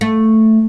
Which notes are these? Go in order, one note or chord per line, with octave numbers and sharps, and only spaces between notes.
A3